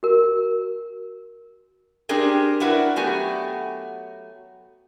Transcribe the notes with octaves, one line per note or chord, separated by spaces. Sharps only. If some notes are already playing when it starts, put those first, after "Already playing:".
F#4 A#4
C4 D4 G4 G#4 A#4
D4 E4 F#4 A#4 B4
F#3 A3 B3 F#4 G4 G#5